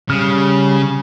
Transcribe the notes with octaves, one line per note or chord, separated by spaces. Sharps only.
C#3 G3 F6